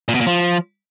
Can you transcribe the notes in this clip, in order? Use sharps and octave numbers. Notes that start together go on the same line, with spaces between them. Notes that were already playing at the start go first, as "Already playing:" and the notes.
A#2
B2
A#2
F3